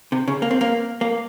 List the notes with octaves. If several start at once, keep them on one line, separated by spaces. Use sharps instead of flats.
C3
C#3
A#3
C4
A#3
A#3